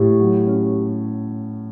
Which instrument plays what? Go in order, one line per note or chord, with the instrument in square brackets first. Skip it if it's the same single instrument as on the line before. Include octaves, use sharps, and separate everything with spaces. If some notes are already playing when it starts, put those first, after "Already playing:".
Already playing: [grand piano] A2 [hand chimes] G4
[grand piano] F#3
C#4